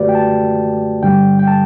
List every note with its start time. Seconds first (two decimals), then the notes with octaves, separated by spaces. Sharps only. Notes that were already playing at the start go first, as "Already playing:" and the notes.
Already playing: F#2 D3 A3 F#4 G4 B4 D5
0.09 G5
0.15 A5
1.03 G2 D3 G3 G5
1.39 G5
1.48 A5